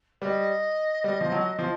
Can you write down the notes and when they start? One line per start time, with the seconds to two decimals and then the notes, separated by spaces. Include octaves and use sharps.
0.21 G3 D#5
1.04 G3
1.21 F3
1.32 F#3
1.59 F3